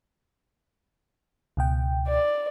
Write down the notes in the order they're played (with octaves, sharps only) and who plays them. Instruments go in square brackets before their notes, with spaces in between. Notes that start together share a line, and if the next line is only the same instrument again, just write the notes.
[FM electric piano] C#2 B2 G5
[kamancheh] D5